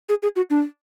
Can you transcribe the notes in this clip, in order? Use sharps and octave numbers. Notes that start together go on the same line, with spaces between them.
G#4
G#4
F#4
D4